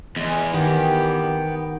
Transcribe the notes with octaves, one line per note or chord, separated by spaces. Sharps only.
E2 G#3
D#3 B3 G4 G5